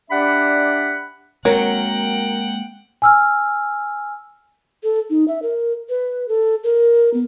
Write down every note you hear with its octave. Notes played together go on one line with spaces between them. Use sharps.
D4 G4 D5 E5 F#5 B5
F#3 G#3 A#3 C4 A#4 F#5 G5
G#5 E6 F6
A4
D#4
E5
A#4
B4
A4
A#4
B3